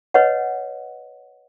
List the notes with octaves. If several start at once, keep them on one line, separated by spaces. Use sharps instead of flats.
B4 C#5 D#5 F#5